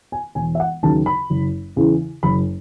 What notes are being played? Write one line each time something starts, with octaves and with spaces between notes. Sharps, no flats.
G#5
E1 G#5
E5
F#5
D#2 C#3 F#3 A5
B5
F#1
E2 C#3 E3
F#1 B5